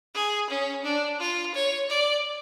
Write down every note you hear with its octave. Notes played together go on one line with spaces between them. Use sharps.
G#4
C#4
D4
F4
C#5
D5